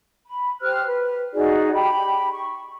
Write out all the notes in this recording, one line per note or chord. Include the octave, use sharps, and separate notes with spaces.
B5
G4 C5 F6 F#6
B4
D#4 F#4 G#4 D5
G4 G5 B5
C#6